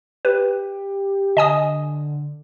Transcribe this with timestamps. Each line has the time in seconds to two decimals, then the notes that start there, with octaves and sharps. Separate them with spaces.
0.25 G4 B4
1.37 D3 D#5 G#5 D#6